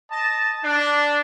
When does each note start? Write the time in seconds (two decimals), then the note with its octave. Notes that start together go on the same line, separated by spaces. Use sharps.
0.11 D#5 A5
0.64 D4